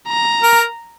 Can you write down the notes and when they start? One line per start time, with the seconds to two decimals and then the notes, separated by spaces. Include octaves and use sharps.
0.08 A#5
0.43 A#4